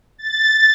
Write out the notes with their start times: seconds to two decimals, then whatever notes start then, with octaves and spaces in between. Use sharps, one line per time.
0.18 A6